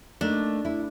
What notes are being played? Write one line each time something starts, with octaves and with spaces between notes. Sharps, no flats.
A3 A#3 D4 D#4
E4